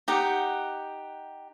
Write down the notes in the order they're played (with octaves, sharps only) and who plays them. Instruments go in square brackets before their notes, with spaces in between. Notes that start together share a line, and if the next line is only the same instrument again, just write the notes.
[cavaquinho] D#4 G4 F#5